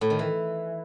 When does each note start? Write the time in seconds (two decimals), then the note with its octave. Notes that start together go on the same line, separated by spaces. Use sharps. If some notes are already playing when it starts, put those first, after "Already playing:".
0.01 A2
0.10 D#3
0.19 E3